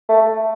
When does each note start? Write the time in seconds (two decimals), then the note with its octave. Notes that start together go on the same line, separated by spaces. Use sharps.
0.09 A3